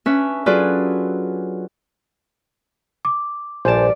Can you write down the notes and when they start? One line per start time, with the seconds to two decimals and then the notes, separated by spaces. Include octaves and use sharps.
0.06 C#4 D4 B4 E5
0.46 F#3 F4 G#4 A4 B4 D5
3.05 D6
3.65 A#1 G2 G3 C5 D5 G#5 A5